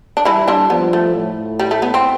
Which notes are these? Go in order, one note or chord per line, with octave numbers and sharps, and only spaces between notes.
D4
E3 G3 E4
D3 D4
F3 B3
A3
A2
G3
A3
B3
C4